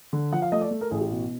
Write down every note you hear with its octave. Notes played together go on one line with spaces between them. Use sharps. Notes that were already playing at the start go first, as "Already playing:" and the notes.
D3
F3 F#5
F5
A3 D#5
D5
A3
A#4
A1 G#4
G4
B2 F#4